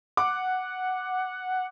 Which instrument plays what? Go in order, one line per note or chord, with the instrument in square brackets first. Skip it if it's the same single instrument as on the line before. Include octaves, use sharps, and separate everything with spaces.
[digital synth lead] F#5 [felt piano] D6